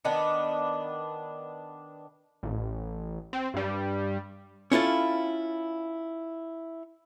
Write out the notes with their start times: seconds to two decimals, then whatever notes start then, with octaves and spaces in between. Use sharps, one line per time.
0.05 D#3 B3 D4
2.43 A1
3.33 C4
3.54 G2 G3
4.72 C#4 E4 F4 A4